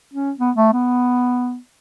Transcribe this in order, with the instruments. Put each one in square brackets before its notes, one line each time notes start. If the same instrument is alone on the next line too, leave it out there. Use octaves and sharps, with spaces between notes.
[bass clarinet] C#4
B3
A3
B3